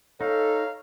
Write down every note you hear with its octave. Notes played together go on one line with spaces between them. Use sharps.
D#4 A4 C#5 F5